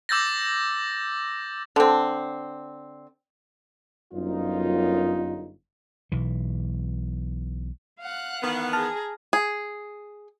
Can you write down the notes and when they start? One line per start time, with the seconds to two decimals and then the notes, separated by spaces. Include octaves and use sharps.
0.09 D6 E6 G6 A6 A#6
1.76 D3 C4
4.13 G1 F#2 D#4 F4
6.12 B1 E3
8.00 F5 F#5 F#6
8.43 D#3 E3 B3
8.73 G#4 A5 A#5 F6
9.33 G#4